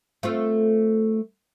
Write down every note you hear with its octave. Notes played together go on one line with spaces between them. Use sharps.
A3 C4 F4